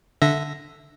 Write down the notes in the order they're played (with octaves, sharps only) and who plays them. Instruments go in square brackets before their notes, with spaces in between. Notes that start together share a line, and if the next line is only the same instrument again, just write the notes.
[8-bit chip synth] D3 E5 A#6